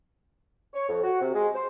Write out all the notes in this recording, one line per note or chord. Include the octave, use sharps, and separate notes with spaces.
C#5
F2
F#4
C3
G#3
C5